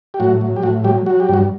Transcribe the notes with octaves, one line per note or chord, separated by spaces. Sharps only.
G4
A2 F#3 F#4
F#3
G4
A2 F#3 F#4
F#3 G3 G4
F#3 F#4
G4
G2 F#3 F#4